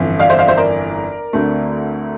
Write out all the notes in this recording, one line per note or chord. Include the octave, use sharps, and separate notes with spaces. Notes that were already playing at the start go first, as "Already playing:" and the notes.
Already playing: G1 F2 E3
D5 F5
C5 E5
D5 F5
C5 E5
A#4 D5
D2 D3 A3 C4